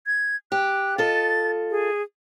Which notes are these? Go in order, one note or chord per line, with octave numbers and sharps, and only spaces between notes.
G#6
G4 F#6
F4 A4 D#5 A6
G#4